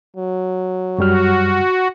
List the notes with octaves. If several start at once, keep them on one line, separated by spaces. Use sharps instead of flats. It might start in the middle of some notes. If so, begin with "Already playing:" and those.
F#3
F#2 G3 F#4 F6